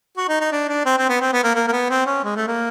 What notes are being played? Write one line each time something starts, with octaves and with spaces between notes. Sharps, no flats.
F#4
D#4
D#4
D4
D4
C4
C4
B3
C4
B3
A#3
A#3
A#3
B3
C4
C#4
G#3
A3
A#3